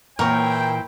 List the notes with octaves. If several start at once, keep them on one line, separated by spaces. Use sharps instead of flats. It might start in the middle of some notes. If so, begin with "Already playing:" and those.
A#2 E3 E4 A#4 C5 C#5 F#5 G5